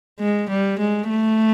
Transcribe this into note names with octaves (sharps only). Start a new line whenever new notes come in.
G#3
G3
G#3
A3